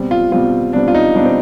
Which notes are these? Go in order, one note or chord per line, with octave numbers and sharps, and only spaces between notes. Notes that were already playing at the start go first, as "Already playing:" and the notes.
Already playing: B2 G3 C4
F4
B2 G3 C4 F4
B2 G3 C4 D4
F4
D#4
B2 G3 C4 D4
C4